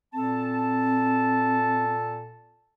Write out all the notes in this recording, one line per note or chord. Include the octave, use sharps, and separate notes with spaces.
A#2 C4 A4 A5